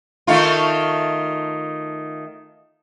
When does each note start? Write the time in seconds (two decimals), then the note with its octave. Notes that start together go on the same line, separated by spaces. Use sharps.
0.27 D#3 A3 F4